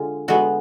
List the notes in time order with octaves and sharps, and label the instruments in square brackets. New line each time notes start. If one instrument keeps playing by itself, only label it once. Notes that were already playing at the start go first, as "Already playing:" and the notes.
Already playing: [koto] D3 G#3 F4
D3 G#3 B3 F#4